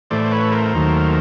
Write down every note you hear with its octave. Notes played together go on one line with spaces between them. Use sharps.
A2 E3 A3 C5 D5
C5
B4 C#5
A#4 C5
D#2 D#3 F#3 A3